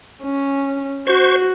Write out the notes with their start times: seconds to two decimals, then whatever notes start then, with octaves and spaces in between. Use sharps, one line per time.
0.23 C#4
1.07 F#4 C5 C#6